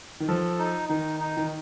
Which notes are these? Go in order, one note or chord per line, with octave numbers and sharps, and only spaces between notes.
D#3
F3 A4
D#4
D#3 D#4
D#4
D#3